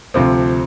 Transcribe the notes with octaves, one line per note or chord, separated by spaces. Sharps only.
D2 C3 F3 C4 F4